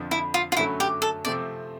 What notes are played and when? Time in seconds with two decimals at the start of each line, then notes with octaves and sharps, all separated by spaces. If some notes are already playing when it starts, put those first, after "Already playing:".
Already playing: F2 D3 F3
0.11 E4
0.34 F4
0.52 F4
0.57 F#2 D3 F#3 A3 E4
0.80 G4
1.02 A4
1.25 C3 F3 A3 C4 D5